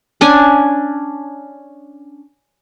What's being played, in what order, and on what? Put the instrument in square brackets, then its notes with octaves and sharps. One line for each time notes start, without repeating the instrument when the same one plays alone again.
[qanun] C#4 D4 G#5